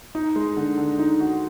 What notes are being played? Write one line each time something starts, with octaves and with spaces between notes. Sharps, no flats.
D#4
G#3
D3
D3
D#4
F#4